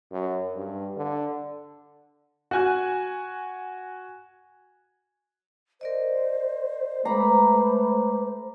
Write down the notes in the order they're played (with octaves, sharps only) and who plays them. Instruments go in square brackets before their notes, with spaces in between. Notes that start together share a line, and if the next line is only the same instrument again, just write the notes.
[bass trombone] F#2
G2
D3
[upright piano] F#4 G#5 F#6
[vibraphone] A#4 D5 D#5 [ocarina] C5
[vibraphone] G#3 D6 [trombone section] A3 B4 [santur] A#5 B5